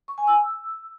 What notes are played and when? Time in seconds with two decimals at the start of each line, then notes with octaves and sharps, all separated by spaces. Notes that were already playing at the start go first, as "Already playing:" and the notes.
0.08 C#6
0.18 G#5
0.27 E6